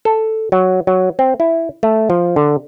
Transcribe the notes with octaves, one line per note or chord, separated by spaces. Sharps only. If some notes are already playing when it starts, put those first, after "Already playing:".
A4
F#3
F#3
C4
E4
A3
F3
D3